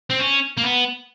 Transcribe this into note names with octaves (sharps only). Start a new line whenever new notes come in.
C4
C#4
A#3
B3